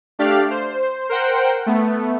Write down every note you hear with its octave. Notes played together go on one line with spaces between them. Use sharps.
A3 D4 G4 D5 F5 F6
C5
A#4 C5 F#5 G5
A3 B3